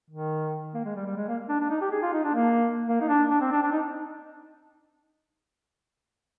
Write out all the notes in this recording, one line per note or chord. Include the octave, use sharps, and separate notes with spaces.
D#3
A#3
G#3
G3
G3
G#3
A#3
D4
D4
D#4
G4
G#4
F4
D#4
D4
A#3
A#3
D#4
D4
D4
C4
D4
D4
D#4